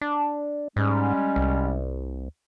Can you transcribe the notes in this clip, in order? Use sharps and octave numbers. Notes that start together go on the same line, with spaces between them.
D4
G#2 G3 G#3 C#4
C2